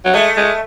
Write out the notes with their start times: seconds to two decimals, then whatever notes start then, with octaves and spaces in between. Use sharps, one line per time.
0.05 F#3
0.13 G#3 A3
0.37 G#3